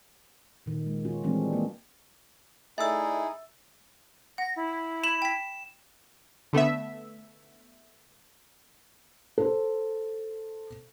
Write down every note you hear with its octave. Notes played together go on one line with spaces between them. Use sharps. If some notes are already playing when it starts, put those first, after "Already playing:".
A#2 D#3
G#3
C#4 F4 F#4
E3 G3 G#3 C4 D4
A#3
A3 D#4 E4 G#4 D5 E5 E6
F#5 A#6
E4
B5 E7 F#7
G5 B6
D3 A3 B3 E5
A4 C5